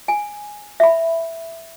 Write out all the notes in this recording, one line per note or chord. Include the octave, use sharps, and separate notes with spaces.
G#5
E5 B5